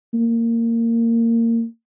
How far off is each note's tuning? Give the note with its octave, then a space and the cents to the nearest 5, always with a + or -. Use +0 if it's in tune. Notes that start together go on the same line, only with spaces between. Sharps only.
A#3 -20